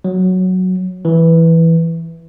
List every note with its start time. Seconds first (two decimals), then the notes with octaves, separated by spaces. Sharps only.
0.04 F#3
1.05 E3